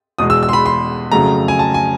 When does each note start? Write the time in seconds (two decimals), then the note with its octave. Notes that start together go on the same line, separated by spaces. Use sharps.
0.19 E2 B2 G#3 D#6
0.30 E6
0.43 E6
0.49 C6
0.53 B5
0.66 C6
1.12 F2 C#3 F#3 A3 A#5
1.48 G#5
1.59 A5
1.74 G#5